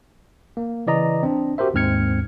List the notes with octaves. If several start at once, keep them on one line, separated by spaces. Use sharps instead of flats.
A#3
C#3 E3 D5 D#5 A#5
C4 D4
F#4 G4 A#4 C5 E5
D#2 G#2 C4 F6 G#6 C#7